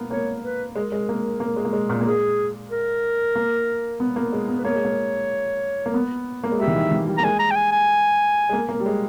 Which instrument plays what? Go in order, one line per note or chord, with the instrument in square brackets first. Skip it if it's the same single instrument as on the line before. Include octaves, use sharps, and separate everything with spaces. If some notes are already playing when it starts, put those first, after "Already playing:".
Already playing: [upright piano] A#3 B3
[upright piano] A#3 [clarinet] C#5
[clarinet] B4
[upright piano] G#3 [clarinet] A#4
[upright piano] G#3
A#3
A#3
G#3
A#3
G#3
A#2
A#3
[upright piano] G#3 [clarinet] G#4
[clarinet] A#4
[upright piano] A#3
B3
A#3
G#3
B3
[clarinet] B4
[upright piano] A#3 [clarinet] C#5
[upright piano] G#3
A#3
A#3
B3
A#3
G#3
[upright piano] G3 [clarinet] E5
[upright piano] E3
D#3
E3
G3
[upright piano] A#3 [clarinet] A#5
[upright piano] G#3 [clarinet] G#5
[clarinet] A#5
G5
G#5
G#5
[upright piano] G#3
A#3
A#3
G3
G#3